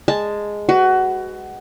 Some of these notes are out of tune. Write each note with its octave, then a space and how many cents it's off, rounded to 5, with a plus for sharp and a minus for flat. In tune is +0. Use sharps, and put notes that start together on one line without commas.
G#3 -5 A5 +0
F#4 +20 B4 +20